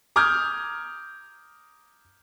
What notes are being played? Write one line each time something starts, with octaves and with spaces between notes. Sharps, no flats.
A#5 D6 D#6 F6 G6 G#6